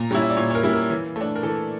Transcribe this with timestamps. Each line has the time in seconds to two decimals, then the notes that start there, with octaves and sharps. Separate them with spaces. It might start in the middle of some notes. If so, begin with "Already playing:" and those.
Already playing: A#2 A#5
0.11 G3 C#4 E4
0.22 E5
0.30 D5
0.37 A#2 C#5
0.51 C#5
0.55 A#4
0.63 G3 C#4 E4
0.73 A#4
0.90 E3
1.16 A3 D4
1.36 A#4
1.43 E3 A4